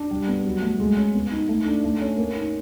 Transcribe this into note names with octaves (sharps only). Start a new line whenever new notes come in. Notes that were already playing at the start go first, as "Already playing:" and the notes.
Already playing: D4
G3
B3
F#3
A3
G#3
C#4
B3
D#4
A3
D4
A3
C#4
A#3
D#4